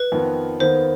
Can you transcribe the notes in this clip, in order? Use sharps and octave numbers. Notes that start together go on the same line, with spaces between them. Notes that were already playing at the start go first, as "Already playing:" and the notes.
Already playing: B4
F2 D#3 B3
D#2 D#3 B3 C5